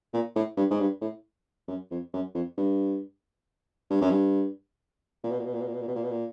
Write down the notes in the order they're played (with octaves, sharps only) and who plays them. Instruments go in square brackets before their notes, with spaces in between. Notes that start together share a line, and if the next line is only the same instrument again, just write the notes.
[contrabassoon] A#2
A2
G2
G#2
G2
A2
F#2
F2
F#2
F2
G2
G2
F#2
G2
A#2
B2
A#2
B2
A#2
B2
A#2
B2
A#2
B2
A#2
B2
A#2